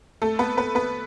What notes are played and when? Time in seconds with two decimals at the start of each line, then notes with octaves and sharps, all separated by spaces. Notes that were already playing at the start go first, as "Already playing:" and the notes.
0.22 A3 A4
0.39 B3 B4
0.57 B3 B4
0.75 B3 B4